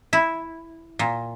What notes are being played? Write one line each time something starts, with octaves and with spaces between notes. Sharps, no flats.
E4
A#2